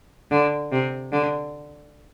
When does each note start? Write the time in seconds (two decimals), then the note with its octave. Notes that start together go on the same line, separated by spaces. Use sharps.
0.30 D3
0.71 C3
1.11 D3